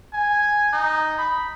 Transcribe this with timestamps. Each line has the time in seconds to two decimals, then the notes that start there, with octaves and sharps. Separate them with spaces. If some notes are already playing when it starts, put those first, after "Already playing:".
0.13 G#5
0.73 D#4
1.18 B5